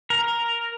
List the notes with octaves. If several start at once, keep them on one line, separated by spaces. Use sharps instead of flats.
A#4